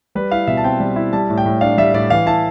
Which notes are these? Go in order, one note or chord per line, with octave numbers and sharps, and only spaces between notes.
G3 B4
E4 F5
B2 E5
A5
C4 G5
G3
E4
G3 A5
A2
G5
A2
D4 F5
G3 E5
A2 D5
E3 F5
E4 A5